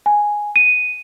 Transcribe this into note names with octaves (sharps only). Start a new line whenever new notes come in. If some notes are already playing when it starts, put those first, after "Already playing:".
G#5
D#7